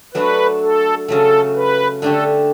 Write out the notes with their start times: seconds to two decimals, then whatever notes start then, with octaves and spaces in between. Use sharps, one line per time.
0.14 F#3 A3 D4 F#4 B4
0.62 A4
1.08 C#3 F#3 A3 A4
1.55 B4
2.02 D3 A3 D4 G4 A4